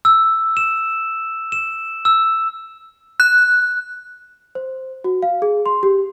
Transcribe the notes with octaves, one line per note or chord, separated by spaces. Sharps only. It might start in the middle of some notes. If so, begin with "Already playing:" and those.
E6
E7
E7
E6
F#6
C5
F#4
F5
G#4
C6
G4